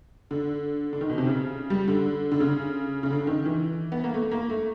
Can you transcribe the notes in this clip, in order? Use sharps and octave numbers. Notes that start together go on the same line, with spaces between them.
D3
D3
D#3
B2
C3
C#3
G3
D3
D3
C#3
C#3
D3
D#3
E3
B3
A#3
A3
A#3
A3